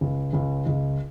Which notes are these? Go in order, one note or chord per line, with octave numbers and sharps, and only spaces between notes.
C#2
C#2
C#2